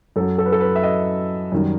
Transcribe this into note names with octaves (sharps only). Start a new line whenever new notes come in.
F#2 F#3 A4
A4
B4
A4
B4
E5
D#5
F#2 D#3 G3